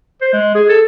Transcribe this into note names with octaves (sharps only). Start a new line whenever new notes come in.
C5
G#3
G#4
A4